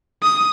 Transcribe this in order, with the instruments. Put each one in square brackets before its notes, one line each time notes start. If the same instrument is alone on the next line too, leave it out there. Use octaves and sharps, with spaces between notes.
[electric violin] D#6